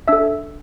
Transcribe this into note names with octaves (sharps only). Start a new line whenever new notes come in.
D4 A4 E5 E6